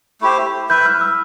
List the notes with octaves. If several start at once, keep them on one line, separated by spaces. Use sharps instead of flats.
A3 E4 G4 C5
E4 B4 E5 G6
F6
E6